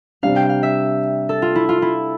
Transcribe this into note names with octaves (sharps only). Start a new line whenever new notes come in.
C3 G3 D4 F5
G5
F5
E5
A4
F4
E4
F4
E4